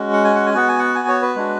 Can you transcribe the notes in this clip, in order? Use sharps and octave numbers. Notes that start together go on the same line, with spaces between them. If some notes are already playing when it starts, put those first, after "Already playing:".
Already playing: G#3 C#4 F#4
F#5
G#5
F#5
G#5
B3 F#4 F#5
G#5
F#5
G#5
C#5
B4
G#3 D4 F#4